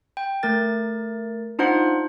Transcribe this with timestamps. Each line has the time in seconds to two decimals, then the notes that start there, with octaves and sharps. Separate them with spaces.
0.17 G5
0.43 A3 A#4 A6
1.59 D4 D#4 F4 C5 F#5